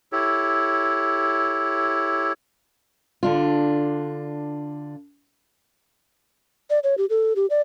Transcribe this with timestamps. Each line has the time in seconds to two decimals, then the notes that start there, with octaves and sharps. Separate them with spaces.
0.12 E4 G4 A4 C#5
3.23 D3 D4 F4
6.70 D5
6.84 C#5
6.98 G4
7.10 A4
7.36 G4
7.50 D5